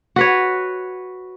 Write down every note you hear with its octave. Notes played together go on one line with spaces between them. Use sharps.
F#4 B4 C#5